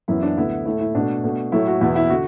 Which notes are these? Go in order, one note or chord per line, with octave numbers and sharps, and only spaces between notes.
F#2 E3 B3 E4
D4
D2 D3 B3 E4
A2 A3 E4
E4
B2 A3 D4
B2 A3
A2 F#3 A3 E4
F#4
E2 B2 B3 E4
E4
D3 F#4